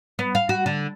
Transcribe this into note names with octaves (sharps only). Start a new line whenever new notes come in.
B3
F5
F#4
D3